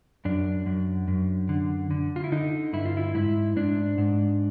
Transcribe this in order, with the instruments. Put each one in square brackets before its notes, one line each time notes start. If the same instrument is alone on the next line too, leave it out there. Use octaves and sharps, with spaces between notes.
[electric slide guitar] F#2 D4
F#2
F#2
D3
D3
F4
E4
D3 D#4
G2 E4
F4
E4
G#2 E4
G#2 D4
G#2